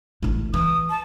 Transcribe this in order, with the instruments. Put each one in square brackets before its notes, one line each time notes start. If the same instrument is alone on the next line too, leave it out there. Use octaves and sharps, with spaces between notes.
[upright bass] A1 E4
[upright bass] E3 [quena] D#6
[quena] A5